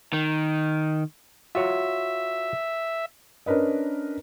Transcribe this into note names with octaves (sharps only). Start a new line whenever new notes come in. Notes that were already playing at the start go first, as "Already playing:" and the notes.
D#3
F4 F#4 C#5 E5
C#4 D4 A#4 B4 D#5